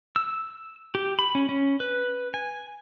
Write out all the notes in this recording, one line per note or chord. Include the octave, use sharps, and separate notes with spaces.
E6
G4
B5
C#4
C#4
B4
G#5